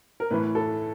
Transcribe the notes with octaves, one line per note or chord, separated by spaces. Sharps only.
A#4
A2 E3 B4
A4